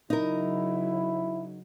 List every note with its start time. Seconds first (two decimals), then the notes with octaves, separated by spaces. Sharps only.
0.10 C#3 F#3 D#4 E4 A#4